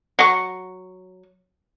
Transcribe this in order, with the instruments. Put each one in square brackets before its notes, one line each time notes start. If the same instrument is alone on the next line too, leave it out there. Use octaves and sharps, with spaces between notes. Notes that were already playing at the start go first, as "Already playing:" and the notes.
[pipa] F#3 C#6